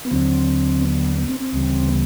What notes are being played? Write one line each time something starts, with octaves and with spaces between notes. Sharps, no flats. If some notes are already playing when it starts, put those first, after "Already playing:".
B3
D#2 D3 F#3 C4
B3
B3
C4
C4
D2 C#3 E3 G3
B3